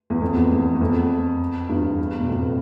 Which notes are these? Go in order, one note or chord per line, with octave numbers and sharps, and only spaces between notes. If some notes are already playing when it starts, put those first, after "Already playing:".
E2
F2
E2
E2
E2
F2
E2 G2
B2
F2 A2